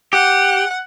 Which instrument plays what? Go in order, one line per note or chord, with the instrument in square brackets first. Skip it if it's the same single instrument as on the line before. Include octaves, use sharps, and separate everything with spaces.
[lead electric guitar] G4 [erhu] F#5